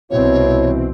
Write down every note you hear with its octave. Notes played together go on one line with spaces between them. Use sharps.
C2 B2 E3 C4 E4 C#5